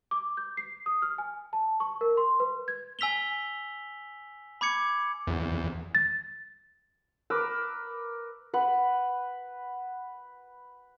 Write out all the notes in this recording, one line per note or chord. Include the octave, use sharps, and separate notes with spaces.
D6
G6
C7
D#6
F6
G#5
A5
C#6
A#4
C6
B4
G#6
G#5 E6 B6 F7 G7
B5 D6 G#6 C#7
E2
A6
A#4 B4 D6 E6
B4 F#5